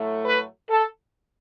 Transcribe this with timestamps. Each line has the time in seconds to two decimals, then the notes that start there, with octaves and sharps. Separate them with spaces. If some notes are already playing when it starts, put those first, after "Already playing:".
Already playing: A2 F#3 A3
0.26 B4
0.69 A4